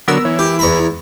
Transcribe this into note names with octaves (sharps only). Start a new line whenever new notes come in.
D3 F#3 B3 A#4 E6
E3 C#5
E4 G4
E2 A#5 B5